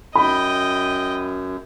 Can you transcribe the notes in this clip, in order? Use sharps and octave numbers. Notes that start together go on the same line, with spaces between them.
F#2 D#5 G5 B5